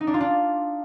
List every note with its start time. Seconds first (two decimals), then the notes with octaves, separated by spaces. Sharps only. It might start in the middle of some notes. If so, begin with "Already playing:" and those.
0.01 D#4
0.07 D4
0.14 F4
0.20 D4